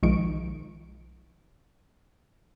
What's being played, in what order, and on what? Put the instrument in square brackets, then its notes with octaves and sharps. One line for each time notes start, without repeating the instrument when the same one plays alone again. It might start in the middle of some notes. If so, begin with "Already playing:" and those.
[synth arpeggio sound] B1 D#3 F3 G#3 C#6 D7